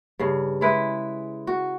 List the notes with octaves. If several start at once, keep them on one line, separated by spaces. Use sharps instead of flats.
G2 C#3
G#3 E4 B4
F#4